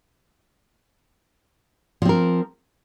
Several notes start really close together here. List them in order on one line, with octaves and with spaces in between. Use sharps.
F3 C4 A#4